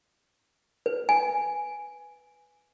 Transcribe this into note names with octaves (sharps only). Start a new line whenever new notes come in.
B4
G#5